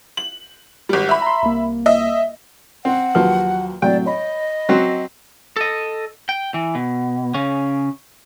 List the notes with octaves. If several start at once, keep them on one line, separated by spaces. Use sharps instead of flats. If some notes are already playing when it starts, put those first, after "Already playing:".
F#7
G#1 G3
E5 B5
A#5 C6
C2 A#3
D#5 E5
C4 F#5
D#2 F3 F#3 B4
A2 C3 F#3 D5 G5
C#5 D#5 B5
F#3 C4 F#4
A4 D#5
G5
E3
B2
C#3 C#4